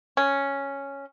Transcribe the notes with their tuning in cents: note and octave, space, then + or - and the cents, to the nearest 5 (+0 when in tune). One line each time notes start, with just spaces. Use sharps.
C#4 +0